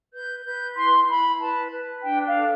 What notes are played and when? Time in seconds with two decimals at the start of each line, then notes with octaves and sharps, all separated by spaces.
0.13 B4 G6
0.44 B4 G6
0.76 E4 C6
1.08 E4 B5
1.39 B4 A5
1.71 B4
2.03 D4 G5
2.27 F5
2.35 A4